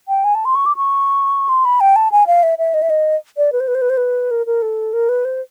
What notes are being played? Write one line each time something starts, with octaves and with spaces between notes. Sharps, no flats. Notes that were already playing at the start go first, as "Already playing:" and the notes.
G5
G#5
A5
C6
C#6
D6
C#6
C6
B5
G5
A5
G#5
F5
E5
E5
D#5
E5
D#5
D5
B4
C5
B4
C5
B4
C5
B4
A#4
A#4
A4
A#4
B4
C5